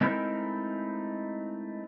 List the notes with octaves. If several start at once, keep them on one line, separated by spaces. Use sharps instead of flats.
G#3 A3 C4 D#4 E4 A#4